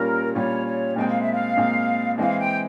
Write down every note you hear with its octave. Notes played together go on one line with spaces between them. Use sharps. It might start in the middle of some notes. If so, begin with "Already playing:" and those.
Already playing: A#2 G3 C#4 F4 A#4
A#2 G3 C#4 F4 C#5
C#5
A#2 G#3 C4 G5
F5
E5
F5
A#2 G#3 C4
E3 G#3 C4 F5
G5